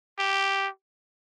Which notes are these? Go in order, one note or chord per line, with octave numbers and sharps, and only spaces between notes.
G4